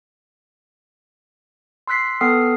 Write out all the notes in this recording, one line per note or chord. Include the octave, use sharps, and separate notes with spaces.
C6 E6 F#6 B6 C7
B3 A4 G5 D#6 F6 C7